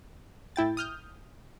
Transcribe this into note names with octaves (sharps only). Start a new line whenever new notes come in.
A2 E4 G5 A6
D#6 F6 G6